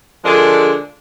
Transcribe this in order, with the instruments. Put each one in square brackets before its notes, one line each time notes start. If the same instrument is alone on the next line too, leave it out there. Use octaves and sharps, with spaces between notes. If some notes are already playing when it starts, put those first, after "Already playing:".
[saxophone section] D3 F3 G#3 D4 G#4 A#4